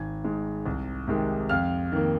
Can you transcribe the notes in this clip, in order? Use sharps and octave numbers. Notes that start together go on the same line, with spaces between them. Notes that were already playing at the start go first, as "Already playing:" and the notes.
Already playing: G#1 G#5 G#6
G#2 G#3
C2
C3 D#3 G#3
F2 F5 F6
D#3 A#3